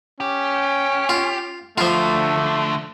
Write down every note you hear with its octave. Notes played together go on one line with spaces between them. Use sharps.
C#4 G4
F4
D2 D3 F3 A3 F4